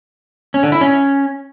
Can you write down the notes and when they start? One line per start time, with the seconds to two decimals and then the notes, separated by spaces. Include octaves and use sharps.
0.54 C#4
0.63 D3
0.72 E4
0.81 C#4